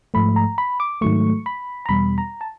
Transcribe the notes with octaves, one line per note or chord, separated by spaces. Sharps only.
G#2 F3 A3 B5
A#5
B5
D6
G#2 D#3 F#3 A3 C#6
B5
A#5
E2 B2 G3 B5
A#5
A5